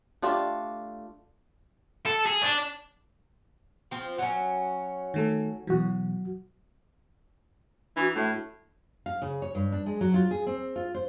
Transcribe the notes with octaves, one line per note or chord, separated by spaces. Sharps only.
A3 D4 F4 G4
A4
G#4
D4
F3 C4
F#3 C#4
D#3 A3 A4
B2 E3 F#3 F#4
E3 D4 E4 F#4
A2 A3 E5
F5
C#3
C#5
G2
D4
G#3
F#3
F4
G#4
C4
F4
C5